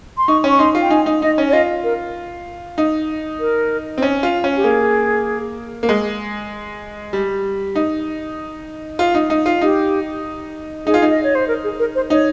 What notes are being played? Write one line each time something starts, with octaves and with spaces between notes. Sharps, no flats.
C6
D#4 C#6
C#4
C#6
D#4 C6
F4
G5
D#4 G#5
D#4
D#4 D#5
C#4
C#5
F4 D#5
A#4
D#4
A#4
C4
C#4
F4
C#4
G4
A#3 G#4
A#3
G#3
G3
D#4
F4
D#4
D#4
F4
D#4 G4
D#4 G#4
F4
D#4
D#5
C#5
C5
A#4
G#4
A#4
C5
D#4 C#5